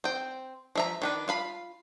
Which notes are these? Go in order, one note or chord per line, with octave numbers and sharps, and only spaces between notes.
C4 G5
F3 E5 A#5
D#3 D4 B4
F4 F5 B5